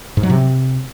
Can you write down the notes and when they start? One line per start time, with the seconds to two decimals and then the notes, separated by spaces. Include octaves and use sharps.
0.17 G#2
0.23 F#3
0.30 C3